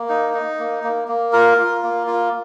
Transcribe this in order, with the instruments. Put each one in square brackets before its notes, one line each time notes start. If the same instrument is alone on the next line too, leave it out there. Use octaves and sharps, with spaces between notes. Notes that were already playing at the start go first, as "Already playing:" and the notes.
Already playing: [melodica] A#3
D#4
D#4
A#3
A#3
A#3
F4 A#4
F4
A#3
F4